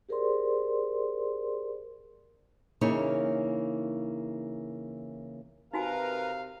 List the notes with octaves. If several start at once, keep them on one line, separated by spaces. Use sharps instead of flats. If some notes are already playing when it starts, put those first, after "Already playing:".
G4 G#4 A#4 C5 D5 C6
C#3 E3 A#3 D#4 G#4 C#5
C3 D#4 F#4 A#4 B4 F5 G#5 A#5